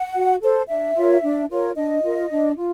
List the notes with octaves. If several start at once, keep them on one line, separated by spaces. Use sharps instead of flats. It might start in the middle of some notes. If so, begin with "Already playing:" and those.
Already playing: F#5
F#4
A4 C5
D4 E5
F4 A#4 C#5
D4
F4 A#4 C#5
D4 D#5
F4 A#4
D4
F4